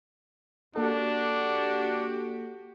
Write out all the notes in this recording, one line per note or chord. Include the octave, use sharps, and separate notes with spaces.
A#3 D4 F#4 G4 A4